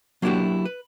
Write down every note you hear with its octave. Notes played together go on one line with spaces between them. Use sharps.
F#3 A#3 D4 E4 F#4 G4
B4